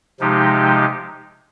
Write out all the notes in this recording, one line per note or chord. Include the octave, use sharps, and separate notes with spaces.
C3 F3 G#3 D#4 G4